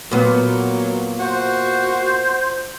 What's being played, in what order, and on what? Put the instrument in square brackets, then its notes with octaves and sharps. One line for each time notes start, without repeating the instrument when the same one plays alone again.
[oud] A#2 B3 [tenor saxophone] F#3
[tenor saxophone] F#4 [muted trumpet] C5